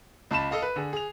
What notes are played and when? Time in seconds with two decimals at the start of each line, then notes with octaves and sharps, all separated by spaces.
0.31 C#2 A5 B5 E7
0.51 A4 D#5 F5
0.62 B4
0.76 D3 G#4
0.93 G#4 F7